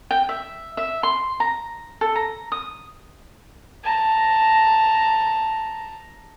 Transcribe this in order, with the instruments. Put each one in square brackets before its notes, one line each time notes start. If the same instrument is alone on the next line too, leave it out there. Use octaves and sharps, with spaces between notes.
[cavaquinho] G5
E5
E5
C6
A#5
A4
A#5
D#6
[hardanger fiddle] A5 A#5